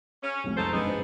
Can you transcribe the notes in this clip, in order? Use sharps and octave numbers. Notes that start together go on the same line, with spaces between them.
C#4
C2 F2 A2
F2 D#4 A4 C5 A6 D7
G1 C#2 B3 D#4 G#4
G#1 D4 C5